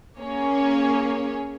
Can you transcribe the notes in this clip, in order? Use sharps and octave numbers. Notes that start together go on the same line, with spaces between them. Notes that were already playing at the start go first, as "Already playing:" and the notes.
A#3 C#4 G#4 C#5